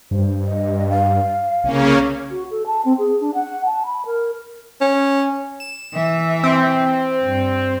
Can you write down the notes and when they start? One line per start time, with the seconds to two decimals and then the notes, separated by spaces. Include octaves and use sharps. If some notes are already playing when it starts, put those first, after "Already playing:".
0.11 G2 C5
0.47 D#5
0.90 F5
1.64 C2 C#3 A#3 C#4
2.30 F#4
2.51 A4
2.66 A5
2.84 C4
2.98 G#4
3.20 D4
3.34 F#5
3.65 A5
3.85 B5
4.05 A#4
4.81 C#4
5.60 E7
5.94 E3 E5
6.44 C4
7.22 G2